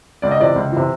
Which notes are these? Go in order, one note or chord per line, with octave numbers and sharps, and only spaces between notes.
C#2 D5
D#5
C3 E3 D5
C#2
C3 E3